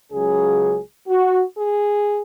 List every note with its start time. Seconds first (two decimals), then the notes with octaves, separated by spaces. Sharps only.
0.11 C#2 C#3 F#3 G#4
1.08 F#4
1.56 G#4